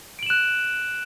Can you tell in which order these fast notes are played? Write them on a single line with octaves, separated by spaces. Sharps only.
D7 F#7 E7 F#6